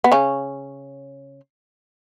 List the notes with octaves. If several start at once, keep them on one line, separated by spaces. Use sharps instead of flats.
B3
C#3 C#4